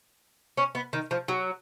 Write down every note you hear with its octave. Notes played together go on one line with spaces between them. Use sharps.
C#4
B3
D#3
F3
F#3